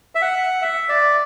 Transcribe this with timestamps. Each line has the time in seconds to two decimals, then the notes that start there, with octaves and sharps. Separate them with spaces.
0.15 E5
0.22 F#5
0.62 E5
0.89 D5